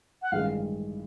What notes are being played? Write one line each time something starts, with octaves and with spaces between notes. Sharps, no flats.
F#5
A1 G2 D#3 G#3 F5